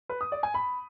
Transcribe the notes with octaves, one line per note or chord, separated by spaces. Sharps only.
B4
D#6
D5
G#5
B5